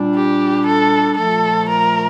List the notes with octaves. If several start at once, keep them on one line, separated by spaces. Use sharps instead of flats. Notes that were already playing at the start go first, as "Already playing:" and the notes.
Already playing: A#2 G3 D4
G4
A4
A#2 F3 A3 A4
A#4